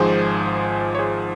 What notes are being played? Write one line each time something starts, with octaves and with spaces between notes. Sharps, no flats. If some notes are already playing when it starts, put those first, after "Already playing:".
Already playing: G#1 G#2 F3 G#4 C5
C#5
G#4 C5